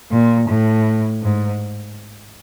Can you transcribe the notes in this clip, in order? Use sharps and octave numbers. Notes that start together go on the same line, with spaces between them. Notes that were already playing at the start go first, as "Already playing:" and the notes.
A#2
A2
G#2